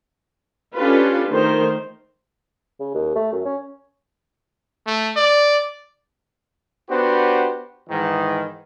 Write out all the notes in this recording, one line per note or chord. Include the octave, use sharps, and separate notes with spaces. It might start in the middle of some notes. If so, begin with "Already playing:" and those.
C#4 D4 F4 G4 A4 B4
D#3 A3 A#4 C5
C#3
D#2
A3
F#2
C#4
A3
D5
B3 D4 F#4 G4 B4 C5
G#2 D#3 E3